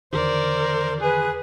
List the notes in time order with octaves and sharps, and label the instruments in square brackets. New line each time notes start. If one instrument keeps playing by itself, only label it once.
[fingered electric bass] E2 D3 D#3 [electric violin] A#4 D5 [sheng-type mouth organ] C5
[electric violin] G#4 [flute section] B4 G#5 F#6